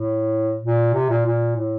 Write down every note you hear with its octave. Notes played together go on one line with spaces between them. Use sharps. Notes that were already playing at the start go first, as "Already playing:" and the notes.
Already playing: A2
A#2
C3
A#2
A#2
A2